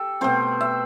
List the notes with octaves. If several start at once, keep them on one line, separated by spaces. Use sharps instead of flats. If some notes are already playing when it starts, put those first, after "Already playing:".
Already playing: G4 A4
B2 A3 C4 C5
E5